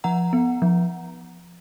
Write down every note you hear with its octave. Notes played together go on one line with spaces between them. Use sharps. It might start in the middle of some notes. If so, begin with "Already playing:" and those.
F3 F#5 A#5
B3
F3